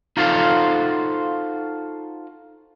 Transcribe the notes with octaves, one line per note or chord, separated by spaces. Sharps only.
D#4 F4 F#4 A4 C5 F5